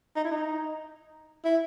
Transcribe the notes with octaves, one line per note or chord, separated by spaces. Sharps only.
D#4
E4
D#4
E4